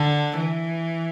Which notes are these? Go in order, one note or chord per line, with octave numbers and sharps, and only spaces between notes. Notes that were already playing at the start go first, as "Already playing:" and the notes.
Already playing: D3
E3